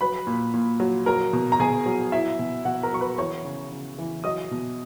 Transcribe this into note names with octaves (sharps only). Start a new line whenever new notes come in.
F#3 B4 B5
A#2
A#2
F#3
F#3 A#4 A#5
B2
A#5
B2 G#4 G#5
F#3
F#3 E4 E5
B2
B2 F#4 F#5
A#4 A#5
F#3 C#6
B4 B5
E3 C#5 C#6
C#3
C#3
E3
F#3 D#5 D#6
B2